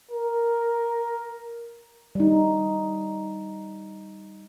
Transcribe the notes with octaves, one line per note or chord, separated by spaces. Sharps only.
A#4
G3 D#4